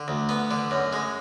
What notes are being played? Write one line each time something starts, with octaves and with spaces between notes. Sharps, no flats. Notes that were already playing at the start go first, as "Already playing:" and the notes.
Already playing: D3
D2
B3
D3
F#2
G#3